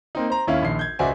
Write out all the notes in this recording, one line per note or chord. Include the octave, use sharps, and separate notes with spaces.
A#3 C4 D#4
C5 A#5
D#2 C#4 E4 E5 F5
A#1 D#2 C7
G6 G#6
C#2 F#4 C5 D5 E5 G#5